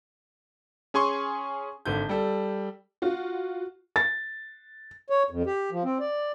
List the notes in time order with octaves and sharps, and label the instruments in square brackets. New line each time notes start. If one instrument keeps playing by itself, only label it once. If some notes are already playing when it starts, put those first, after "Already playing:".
[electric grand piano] C#4 G#4 G#5 C6 C#6
[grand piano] G#1 D3 G6
G3 A4
[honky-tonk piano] F4 F#4
[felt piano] A6
[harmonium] C#5
F2
G4
F3
C4
D5